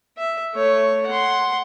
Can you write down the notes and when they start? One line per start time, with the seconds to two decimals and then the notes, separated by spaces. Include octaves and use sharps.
0.18 E5
0.54 A3 C#5
1.07 F#5 C6